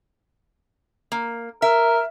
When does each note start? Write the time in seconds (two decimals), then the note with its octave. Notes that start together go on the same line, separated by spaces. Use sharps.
1.12 A#3
1.62 A#4 E5